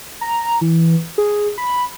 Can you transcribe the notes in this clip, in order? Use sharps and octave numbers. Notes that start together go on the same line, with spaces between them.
A#5
E3
G#4
B5